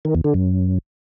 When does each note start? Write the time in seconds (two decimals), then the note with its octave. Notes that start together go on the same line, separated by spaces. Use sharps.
0.05 D#3
0.15 E2
0.24 D3
0.34 F#2